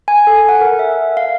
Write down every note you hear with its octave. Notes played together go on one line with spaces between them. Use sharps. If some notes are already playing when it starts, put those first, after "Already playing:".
G#5
A4
F#5
A#4
E5
F5